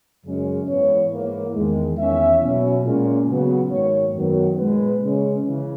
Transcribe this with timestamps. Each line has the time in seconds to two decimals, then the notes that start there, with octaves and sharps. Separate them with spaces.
0.25 F#2 C#3 G#3 C#4
0.67 G#2 E3 B3 C#5
1.11 G#2 E3 A#3
1.54 E2 D#3 G#3
1.98 E2 D#3 A#3 C#4 E5
2.42 B2 F#3 C#4
2.84 A#2 G#3 C#4
3.27 C#3 F#3 B3
3.71 G#2 D#3 F#3 A#3 C#5
4.15 F#2 D#3 F#3 B3
4.57 A#2 G#3 B3 B4
5.01 C#3 G#3 C#4
5.44 C#3 E3